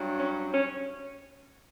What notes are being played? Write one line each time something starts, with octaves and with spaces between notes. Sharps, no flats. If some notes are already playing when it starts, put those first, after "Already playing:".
Already playing: G2 F#3
C#4
C#4